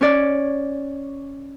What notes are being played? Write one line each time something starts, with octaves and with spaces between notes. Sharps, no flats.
C#4 C#5 D5